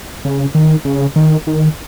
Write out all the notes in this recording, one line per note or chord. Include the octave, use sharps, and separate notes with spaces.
C#3
D#3
C#3
D#3
D#3